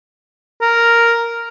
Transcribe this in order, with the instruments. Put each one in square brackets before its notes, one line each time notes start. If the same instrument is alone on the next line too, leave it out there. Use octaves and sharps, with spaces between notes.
[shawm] A#4